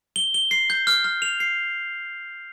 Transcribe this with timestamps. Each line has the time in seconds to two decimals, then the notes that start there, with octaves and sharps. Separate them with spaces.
0.16 G7
0.34 G7
0.51 C7
0.70 G6
0.87 F6
1.04 F6
1.22 F7
1.40 C7